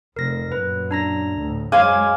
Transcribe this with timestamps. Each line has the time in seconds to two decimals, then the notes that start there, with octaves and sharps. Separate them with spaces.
0.16 F1 A#4 A#6
0.52 F#2 A#2 B4
0.91 D4 A#5 A#6
1.37 D2 A2
1.72 F#2 G#3 C5 C#5 F5 G#5 D6